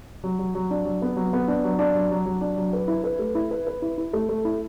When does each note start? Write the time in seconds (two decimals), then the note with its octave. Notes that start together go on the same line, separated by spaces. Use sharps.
0.24 F#3
0.39 F#3
0.55 F#3
0.71 D4
0.85 F#3
1.02 B3
1.16 F#3
1.33 B3
1.48 D4
1.64 F#3
1.79 D4
1.95 F#3
2.11 F#3
2.26 F#3
2.41 D4
2.58 F#3
2.73 B4
2.88 E4
3.04 B4
3.19 A3
3.35 E4
3.51 B4
3.67 B4
3.82 E4
3.98 E4
4.13 A3
4.29 A3
4.45 E4